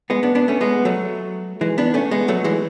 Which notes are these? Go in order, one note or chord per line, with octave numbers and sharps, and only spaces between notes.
G#3 B3
B3 D4
B3 D4
A3 C#4
G#3 B3
F#3 A3
E3 G#3
B3 D4
A3 C#4
G#3 B3
F#3 A3
E3 G#3